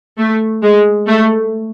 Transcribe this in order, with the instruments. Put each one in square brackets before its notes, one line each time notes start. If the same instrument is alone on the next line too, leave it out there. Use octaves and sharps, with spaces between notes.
[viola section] A3
G#3
A3